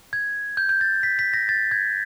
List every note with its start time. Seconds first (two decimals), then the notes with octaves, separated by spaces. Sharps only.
0.13 G#6
0.57 G6
0.69 G6
0.81 A6
1.03 B6
1.19 B6
1.34 A#6
1.49 A6
1.71 G#6